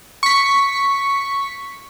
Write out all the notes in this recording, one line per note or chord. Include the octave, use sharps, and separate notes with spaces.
C#6 B6